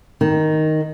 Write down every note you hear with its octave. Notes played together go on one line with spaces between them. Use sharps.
D#3